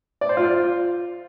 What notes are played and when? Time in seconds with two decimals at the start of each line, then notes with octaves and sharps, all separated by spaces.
0.21 D5
0.29 C5
0.37 F4